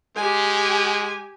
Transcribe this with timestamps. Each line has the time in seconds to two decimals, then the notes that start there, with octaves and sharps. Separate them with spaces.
0.16 G#3 G4 G#5